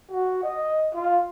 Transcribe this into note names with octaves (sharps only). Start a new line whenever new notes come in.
F#4
D#5
F4